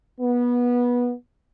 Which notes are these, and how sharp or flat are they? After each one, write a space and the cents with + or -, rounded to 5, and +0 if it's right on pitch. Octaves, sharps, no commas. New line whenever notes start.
B3 -20